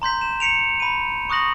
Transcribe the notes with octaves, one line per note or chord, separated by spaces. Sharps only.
A#5 C6 G6 B6
E7
B6 C#7 D7 F7
B5 D#7
C#6 D#6 F#6 A#6 F#7